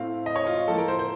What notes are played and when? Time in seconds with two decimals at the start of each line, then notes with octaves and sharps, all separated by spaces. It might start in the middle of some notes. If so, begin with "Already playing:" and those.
Already playing: A2 A3 C4 F5
0.26 D#5
0.36 C#5
0.47 F4
0.58 F4
0.68 A2 F3 A#3 A4
0.78 A#4
0.88 C5
0.99 C5